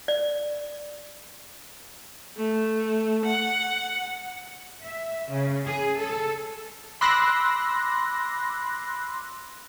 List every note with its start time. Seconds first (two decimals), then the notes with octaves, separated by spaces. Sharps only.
0.08 D5
2.37 A3
3.25 F#5
4.84 E5
5.30 C#3
5.66 G#4
6.00 A4
7.01 B5 C6 D6 E6 F#6 A#6